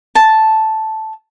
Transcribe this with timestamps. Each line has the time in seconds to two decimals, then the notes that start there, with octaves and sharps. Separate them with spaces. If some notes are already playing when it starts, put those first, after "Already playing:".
0.15 A5